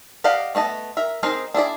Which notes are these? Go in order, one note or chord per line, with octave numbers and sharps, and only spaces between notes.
G4 D5 D#5 F5 F#5
A3 B3 D#5 A5
A#4 E5
C4 D#4 G#4 A#4
D4 E4 G#4 D5